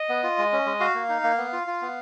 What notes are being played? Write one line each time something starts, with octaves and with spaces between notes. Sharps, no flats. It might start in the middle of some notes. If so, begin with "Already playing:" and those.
Already playing: D#5
B3
F4
G#3
C#4
G#3
F#4 F5
A#3
D#4
A#3
B3
F4
F4
B3